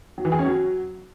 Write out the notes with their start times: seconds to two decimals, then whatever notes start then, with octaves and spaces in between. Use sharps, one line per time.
0.18 F#3
0.25 E3
0.32 G#4
0.39 C#4
0.46 F#3